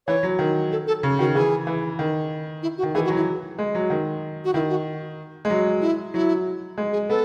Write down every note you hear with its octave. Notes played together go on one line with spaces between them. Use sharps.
E3 C#5
F#3
D#3
A4
A4
C#3
D#3 F#4
E3 G#4
E3
D#3
E4
F#4
D#3
E3 G#4
F#4
F#3
E4
G#3
F#3
D#3
F#4
D#3 E4
F#4
G#3
F#3
E4
F#3 E4
G#3
G#4
B3 A4